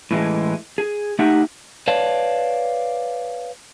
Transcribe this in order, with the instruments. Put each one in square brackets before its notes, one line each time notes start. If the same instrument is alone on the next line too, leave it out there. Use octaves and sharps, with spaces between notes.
[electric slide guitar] A2 E3 G#3 A3
G#4
A3 D#4 G4 E5 F#5
B4 C#5 D5 F5 A5